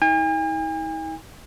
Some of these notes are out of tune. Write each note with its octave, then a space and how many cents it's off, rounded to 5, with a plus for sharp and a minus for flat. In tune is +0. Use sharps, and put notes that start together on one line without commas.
D#4 +45 G#5 -45